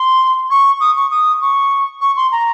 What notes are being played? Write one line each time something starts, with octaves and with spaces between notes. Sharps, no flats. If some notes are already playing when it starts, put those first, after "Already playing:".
Already playing: C6
C#6
D#6
C#6
D#6
C#6
C#6
C6
A#5